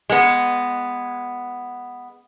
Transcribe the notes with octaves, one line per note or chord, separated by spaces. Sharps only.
G#3 B3